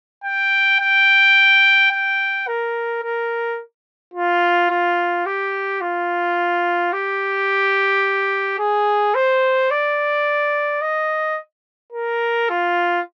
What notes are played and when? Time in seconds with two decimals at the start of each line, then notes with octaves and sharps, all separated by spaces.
0.24 G5
0.80 G5
1.91 G5
2.47 A#4
3.03 A#4
4.14 F4
4.70 F4
5.26 G4
5.81 F4
6.93 G4
8.59 G#4
9.15 C5
9.70 D5
10.81 D#5
11.93 A#4
12.49 F4